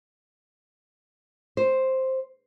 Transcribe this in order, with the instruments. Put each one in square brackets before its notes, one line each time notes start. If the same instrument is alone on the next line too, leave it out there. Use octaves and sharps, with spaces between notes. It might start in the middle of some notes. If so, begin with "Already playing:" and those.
[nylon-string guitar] C5